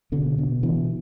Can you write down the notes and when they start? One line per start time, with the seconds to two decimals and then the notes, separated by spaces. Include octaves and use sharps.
0.12 B2 D3
0.38 B2
0.63 B2 E3